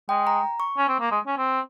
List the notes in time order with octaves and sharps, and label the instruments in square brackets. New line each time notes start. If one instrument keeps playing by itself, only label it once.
[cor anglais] G#3 [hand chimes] G5
[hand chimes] A#5
C#6
[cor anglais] C#4
C4
A#3
G#3
C#4
C4